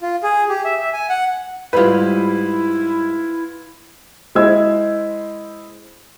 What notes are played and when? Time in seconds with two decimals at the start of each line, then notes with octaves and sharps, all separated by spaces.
0.02 F4
0.23 G#4
0.49 G4
0.65 E5
0.78 E5
0.93 G#5
1.10 F#5
1.73 G#2 G3 E4 F4 B4
4.35 G#3 E4 C5 E6 G#6